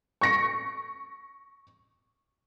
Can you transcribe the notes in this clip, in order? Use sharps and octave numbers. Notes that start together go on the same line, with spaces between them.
C#6 A#6 C#7